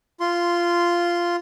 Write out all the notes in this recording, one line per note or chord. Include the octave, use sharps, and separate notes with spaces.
F4 C6